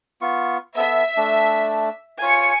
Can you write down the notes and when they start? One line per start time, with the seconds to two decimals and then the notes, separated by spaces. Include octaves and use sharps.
0.21 B3 F4 C#6
0.77 B3 A4 E5
1.17 A3 D4
2.22 F4 C#5 G#5 C#7